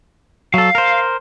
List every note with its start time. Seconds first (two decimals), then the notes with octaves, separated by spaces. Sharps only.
0.54 F#3 A4 F5
0.75 A#4 C5